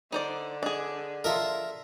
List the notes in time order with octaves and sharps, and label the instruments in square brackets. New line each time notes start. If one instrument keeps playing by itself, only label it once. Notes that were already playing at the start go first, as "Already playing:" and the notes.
[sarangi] D3 [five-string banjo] D#4 C5 D5
[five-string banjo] D4 G#4 [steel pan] D#5
[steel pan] F4 A4 D#5 [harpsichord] A#4 E5